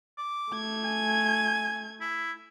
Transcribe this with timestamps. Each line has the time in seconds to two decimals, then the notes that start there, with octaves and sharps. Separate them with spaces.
0.18 D6
0.52 A3 G#6
0.85 G#5
2.01 E4